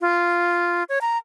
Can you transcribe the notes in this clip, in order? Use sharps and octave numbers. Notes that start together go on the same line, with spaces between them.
F4
C#5
A#5